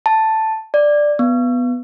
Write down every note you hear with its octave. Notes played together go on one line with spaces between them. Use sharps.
A5
D5
B3